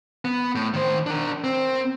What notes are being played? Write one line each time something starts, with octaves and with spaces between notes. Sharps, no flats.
B3
A2
D#3 C5
D4 A#4
C4